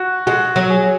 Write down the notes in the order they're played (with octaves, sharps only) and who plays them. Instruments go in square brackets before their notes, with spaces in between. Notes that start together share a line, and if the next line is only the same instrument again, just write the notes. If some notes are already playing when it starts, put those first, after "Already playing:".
Already playing: [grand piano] F#4
[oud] G#3 [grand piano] F#4
[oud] F#3
[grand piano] G#4